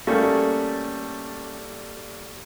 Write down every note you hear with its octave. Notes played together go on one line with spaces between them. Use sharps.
G3 A3 A#3 C#4 G#4 A4